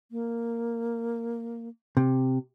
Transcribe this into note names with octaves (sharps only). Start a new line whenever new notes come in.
A#3
C3